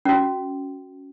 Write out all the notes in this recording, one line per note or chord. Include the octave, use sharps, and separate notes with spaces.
C#4 F#4